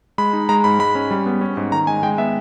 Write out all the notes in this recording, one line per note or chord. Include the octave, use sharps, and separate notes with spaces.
G#3 B5
D#4
G#3 A#5
G#2 B5
G#3 B5
C#4
G3
B3
C#4
G#2
D#3 A#5
G#3 G#5
G#3 G5
B3 E5